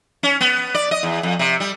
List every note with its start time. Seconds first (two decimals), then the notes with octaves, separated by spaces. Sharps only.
0.23 C#4
0.41 B3
0.74 D5
0.91 D#5
1.03 E2
1.23 F2
1.39 C3
1.60 G3